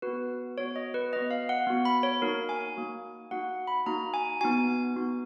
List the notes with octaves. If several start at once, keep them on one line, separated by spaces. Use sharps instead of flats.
B3 F#4 B4
B3 F#4 C#5
D#5
B4
B3 F#4 D#5
F5
F#5
B3 F#4
B5
C#5
A#3 D#4 F#4 A#4
G#5
A#3 D#4 F#4
A#3 D#4 F#4 F#5
B5
A#3 D#4 F#4 A#5
G#5
B3 D#4 F#4 G#5
B3 D#4 F#4